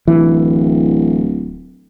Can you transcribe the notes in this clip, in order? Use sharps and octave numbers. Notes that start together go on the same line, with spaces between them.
D1 E3